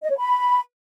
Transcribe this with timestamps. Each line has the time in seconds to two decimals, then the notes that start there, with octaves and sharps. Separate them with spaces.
0.03 D#5
0.10 C#5
0.17 B5